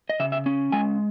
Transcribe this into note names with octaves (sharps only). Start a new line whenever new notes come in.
D#5
C#3 E5
E5
C#4
G#3 G#5